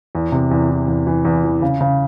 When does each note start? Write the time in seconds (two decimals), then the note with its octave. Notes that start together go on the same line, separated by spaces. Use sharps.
0.15 E2
0.32 C3
0.51 E2
0.69 E3
0.88 E2
1.07 E3
1.25 E2
1.44 E3
1.62 C#3
1.81 C#3